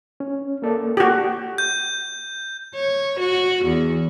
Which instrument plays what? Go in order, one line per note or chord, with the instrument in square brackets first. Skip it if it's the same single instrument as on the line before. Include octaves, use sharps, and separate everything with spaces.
[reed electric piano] C#4
A#3 A4 D5
[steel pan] F#4 G4
[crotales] G6
[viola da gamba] C#5
F#4
E2